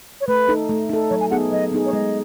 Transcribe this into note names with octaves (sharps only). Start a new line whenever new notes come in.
C#5
A3 B4
D#4 A4
A3
D#4 A4
F#3 C#5
G#5
B3 D#4 G#4 F#5
F#3 D#5
B3 D#4 G#4
C#5
G#3 D#5